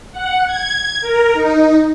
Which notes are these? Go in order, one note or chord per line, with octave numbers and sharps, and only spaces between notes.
F#5
G#6
A#4
D#4